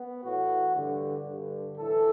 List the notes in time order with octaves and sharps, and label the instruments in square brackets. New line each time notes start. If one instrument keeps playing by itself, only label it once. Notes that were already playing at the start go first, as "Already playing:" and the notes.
Already playing: [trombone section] B3
A2 E3 F#4
G2 D3
G2 D3
A2 E3 A4